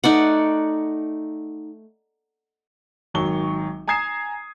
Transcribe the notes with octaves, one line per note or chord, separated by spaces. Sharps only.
A3 D#4 D5 F#5
G#1 D#3 F#3 C#6 G7
G#5 A#5 D#6 G#6 C7 E7